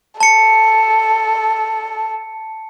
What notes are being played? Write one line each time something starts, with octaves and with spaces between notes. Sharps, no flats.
A4 A5 C#7